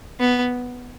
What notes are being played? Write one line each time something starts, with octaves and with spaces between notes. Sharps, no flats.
B3